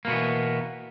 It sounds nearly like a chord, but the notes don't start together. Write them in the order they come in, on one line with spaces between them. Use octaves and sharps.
A#3 B2 B3 E3